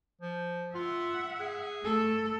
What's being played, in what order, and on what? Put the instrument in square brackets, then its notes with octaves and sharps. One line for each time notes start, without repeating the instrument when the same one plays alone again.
[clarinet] F3
[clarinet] F4 [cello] E5 F#5
[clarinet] G#4
[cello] A3 A4